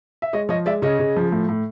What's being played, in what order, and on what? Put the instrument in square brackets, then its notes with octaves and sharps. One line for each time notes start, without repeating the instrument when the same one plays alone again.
[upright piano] E5
G#3 C#5 D#5
F3 C#5 D#5
G#3 D5 E5
C#3 C#5 D#5
C#3
F3
A2
A2